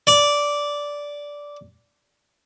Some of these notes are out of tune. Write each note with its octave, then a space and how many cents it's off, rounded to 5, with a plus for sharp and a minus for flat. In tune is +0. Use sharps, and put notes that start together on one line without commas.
D5 -10